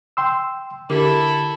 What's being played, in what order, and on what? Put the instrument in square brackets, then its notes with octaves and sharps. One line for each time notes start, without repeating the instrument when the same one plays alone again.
[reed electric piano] G5 C6 E6
[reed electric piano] D3 [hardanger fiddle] E4 A4 [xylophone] G4 A#4 D6